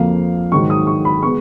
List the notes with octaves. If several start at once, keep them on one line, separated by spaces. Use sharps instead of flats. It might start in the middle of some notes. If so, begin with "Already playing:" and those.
Already playing: F2 F3 A#3 F5
G#2 D#3 F#3 C#6
D#6
C#6
B5
G#3 B3 C#6